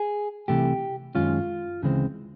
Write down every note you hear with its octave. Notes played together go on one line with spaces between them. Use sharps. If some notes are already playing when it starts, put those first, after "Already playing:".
Already playing: G#4
C2 C3 E3 A3 G4
F#2 D#3 G#3 C#4 F4
D2 C#3 E3 G#3 C4